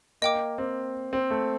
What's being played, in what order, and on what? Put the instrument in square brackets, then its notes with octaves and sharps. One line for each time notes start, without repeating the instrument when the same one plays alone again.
[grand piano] A#3 [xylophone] D#5 G5 D6
[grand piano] C4
C4
A3